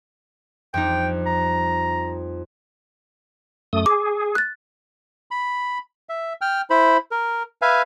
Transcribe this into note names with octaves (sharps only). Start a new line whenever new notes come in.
F2 G3 D#4 G5
A#5
F#2 A3 D#6
G#4 D6
F#6 A6
B5
E5
G5 F6
E4 C5 B5
A#4
B4 E5 F5 G#5